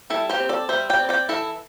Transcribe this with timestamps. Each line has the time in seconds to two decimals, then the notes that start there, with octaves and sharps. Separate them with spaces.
0.10 G3 E4 A4
0.30 G4 C5
0.40 C4
0.49 A4 D5
0.69 G3 C5 E5
0.90 D5 G5
0.99 C4
1.09 D5 G5
1.29 E3 E4 A4